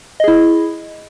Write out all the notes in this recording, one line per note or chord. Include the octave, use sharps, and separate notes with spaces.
E4 G#4 D#5